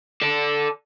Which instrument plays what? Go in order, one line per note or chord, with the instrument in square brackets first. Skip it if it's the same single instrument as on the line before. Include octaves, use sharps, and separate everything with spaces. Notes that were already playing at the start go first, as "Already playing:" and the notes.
[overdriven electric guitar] A4 D5